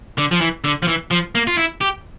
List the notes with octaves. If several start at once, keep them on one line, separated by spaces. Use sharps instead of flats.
D3
F3
E3
D3
F3
E3
F3
A#3
F4
E4
G4